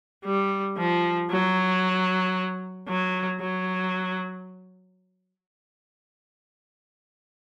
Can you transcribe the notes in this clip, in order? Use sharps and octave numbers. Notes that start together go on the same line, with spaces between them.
G3
F3
F#3
F#3
F#3